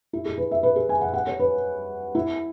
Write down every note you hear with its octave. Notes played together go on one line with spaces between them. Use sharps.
E4
G#4
B4
E5
B4
G#4
G#5
F#5
F#5
C#5
B4
E4